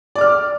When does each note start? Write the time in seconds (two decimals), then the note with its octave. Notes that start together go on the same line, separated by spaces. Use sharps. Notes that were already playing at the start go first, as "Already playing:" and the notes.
0.15 D5
0.18 D6
0.21 F6